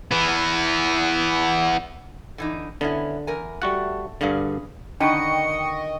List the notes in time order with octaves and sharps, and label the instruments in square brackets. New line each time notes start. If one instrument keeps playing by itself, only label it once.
[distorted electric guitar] E3 B3
[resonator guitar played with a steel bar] D3 E3 D#4
[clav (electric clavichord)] D3 [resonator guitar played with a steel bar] B3 C#4 E4
[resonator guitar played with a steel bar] E2 A#4 G#5
[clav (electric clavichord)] G3 F#4 F#5 [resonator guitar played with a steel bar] A3
[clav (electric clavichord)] G2 D3 [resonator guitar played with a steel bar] G3 G#4 F5
[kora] D3 D#3 B4 [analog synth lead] D#5 [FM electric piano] G5 C#6 [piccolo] C#7